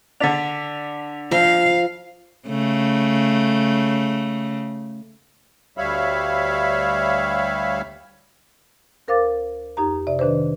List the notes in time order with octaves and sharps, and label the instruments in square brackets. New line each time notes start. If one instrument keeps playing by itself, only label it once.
[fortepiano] D3 D4 [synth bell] B6 F7
[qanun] F3 [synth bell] F4 [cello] F5
[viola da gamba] C#3 A3
[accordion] D2 G3 C#5 E5 F5 B5
[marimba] D2 A#4 C5 F5 D6 A6
F2 D#4 G4 A#5
C3 D5 E5
D#3 D4 B4 C5